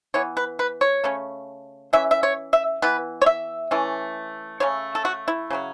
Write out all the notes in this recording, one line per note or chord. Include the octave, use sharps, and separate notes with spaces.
E3 B3 C#5
B4
B4
C#5
C#3 A3 C#4
E3 C#4 E5
E5
C#5
E5
E3 B3 B4
C#5
E5
E3 A3 C#4
C#3 A3 C#4 C#5
A4
F#4
E4
C#3 F#3 C#4